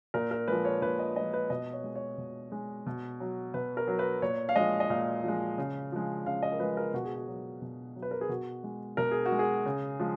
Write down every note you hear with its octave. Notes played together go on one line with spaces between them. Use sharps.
A#2 A#4
A#4
F3 G#3 B4
C#5
A#2 B4
D#5
F3 G#3 D#5
B4
B2 D#5
C#5
G#3
C#5
B2
G#3
B2
F#3
B2 B4
A#4
F#3
B4
A#2 C#5
F5
F3 G#3 D#5
D#5
A#2 F5
F3 G#3
C#3
F3 G#3
C#3 F5
D#5
A#4
F3 G#3 B4
A#4
B2 F#4
G#4
F#4
F#3
B2
F#3
B4
A#4
G#4
B2 F#4
G#3
B2 A#4
G#4
F#4
G#3
G#4
C#3
F3 G#3